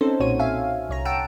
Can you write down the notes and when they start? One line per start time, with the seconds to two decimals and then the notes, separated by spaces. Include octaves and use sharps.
0.01 C4 C#4 D#4 A4 C5
0.20 B1 A#2 F#4 C#5 D#7
0.39 E5 F5 G#5
0.89 C2 C#5 A#5
1.05 F#5 G5 A5 A#5 E6 D7